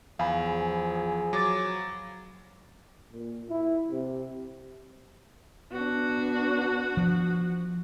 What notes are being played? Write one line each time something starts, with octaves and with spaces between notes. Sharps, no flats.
E2 F3 G#4 F5 G#5 B5
F#3 D6 A6
A#2
E4
C3
B3 D4 F#4
F3